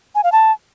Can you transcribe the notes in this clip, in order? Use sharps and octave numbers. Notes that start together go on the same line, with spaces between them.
G#5
F5
A5